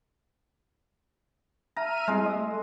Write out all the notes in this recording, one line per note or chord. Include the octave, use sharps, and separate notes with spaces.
E5 A#5 F6 D#7
G3 G#3 C4 E4
D#5 E5 D#6
A3